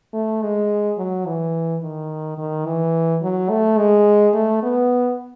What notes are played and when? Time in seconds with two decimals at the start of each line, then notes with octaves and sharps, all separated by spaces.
0.14 A3
0.42 G#3
0.98 F#3
1.26 E3
1.82 D#3
2.38 D#3
2.66 E3
3.22 F#3
3.50 A3
3.78 G#3
4.34 A3
4.63 B3